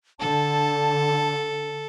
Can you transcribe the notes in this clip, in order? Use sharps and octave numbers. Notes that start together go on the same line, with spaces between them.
D3 A4 A5